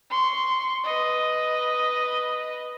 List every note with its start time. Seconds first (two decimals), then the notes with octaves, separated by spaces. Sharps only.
0.10 C6 C#6
0.84 B4 D#5